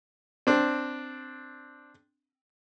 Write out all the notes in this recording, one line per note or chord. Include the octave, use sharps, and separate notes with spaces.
C4 D4